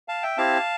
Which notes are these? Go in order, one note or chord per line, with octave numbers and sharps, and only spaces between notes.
F5 A5
E5 G5
C4 E4 G4 F5 A5